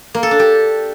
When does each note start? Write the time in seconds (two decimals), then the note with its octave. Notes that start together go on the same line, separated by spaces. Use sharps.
0.14 A#3
0.23 A4
0.31 D4
0.39 G4